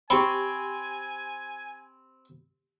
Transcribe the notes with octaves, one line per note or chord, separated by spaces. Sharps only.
C4 G4 G5 G#5 B5